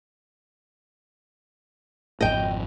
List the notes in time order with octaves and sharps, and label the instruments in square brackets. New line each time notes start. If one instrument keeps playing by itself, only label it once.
[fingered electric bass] G#1 F2 [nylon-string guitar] D#5 G5